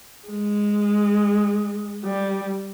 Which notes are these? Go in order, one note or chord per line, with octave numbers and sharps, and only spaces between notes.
G#3
G3